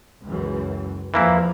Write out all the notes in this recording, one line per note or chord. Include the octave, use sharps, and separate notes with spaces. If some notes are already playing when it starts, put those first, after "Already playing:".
C#2 F#2 E3
E2 E3 F3 A#3 E4